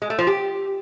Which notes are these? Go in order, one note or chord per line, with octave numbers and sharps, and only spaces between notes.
G#3
A3
F3
G4